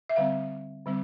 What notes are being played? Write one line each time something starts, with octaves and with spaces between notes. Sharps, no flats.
E5
D3 G3 C4 F5
D3 G3 C4